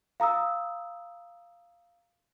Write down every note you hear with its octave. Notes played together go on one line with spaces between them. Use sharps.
F5 A#5 D#6 E6